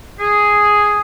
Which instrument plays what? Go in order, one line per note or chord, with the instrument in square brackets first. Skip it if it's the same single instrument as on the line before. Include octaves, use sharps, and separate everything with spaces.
[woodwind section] G#4